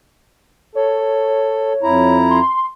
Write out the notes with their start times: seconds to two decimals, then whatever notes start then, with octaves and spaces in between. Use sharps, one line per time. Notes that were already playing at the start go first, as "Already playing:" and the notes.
0.75 A4 C#5
1.83 F2 E4 A#5
2.30 C6